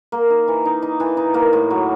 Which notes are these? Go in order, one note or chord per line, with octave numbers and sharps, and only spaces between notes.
A#3
D#4
E3
D#4
D#4
E3
D#4
A#3
A2
F#3